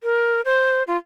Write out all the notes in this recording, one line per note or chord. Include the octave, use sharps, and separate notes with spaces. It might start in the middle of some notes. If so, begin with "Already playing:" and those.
A#4
C5
F4